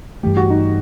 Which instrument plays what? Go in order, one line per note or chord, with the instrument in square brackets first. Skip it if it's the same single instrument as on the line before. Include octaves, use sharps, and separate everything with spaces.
[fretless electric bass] G2 E3 A3 [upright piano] G4
[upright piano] F#4
D#4